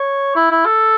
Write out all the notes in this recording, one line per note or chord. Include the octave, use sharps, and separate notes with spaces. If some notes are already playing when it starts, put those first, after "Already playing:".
Already playing: C#5
E4
E4
A4